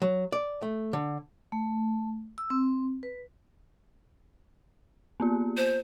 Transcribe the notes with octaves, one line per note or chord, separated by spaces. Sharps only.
F#3
D5
A3
D3
A3
E6
C4
B4
A#3 B3 F4
C5